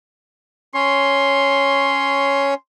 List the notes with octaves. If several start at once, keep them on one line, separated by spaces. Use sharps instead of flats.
C#4 C#5 C6